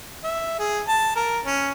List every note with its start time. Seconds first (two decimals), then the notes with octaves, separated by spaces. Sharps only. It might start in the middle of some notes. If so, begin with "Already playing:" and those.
0.24 E5
0.59 G#4
0.88 A5
1.16 A#4
1.46 C#4